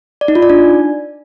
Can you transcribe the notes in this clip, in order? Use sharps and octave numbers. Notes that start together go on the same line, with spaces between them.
D5
D#4
F4
D5
D4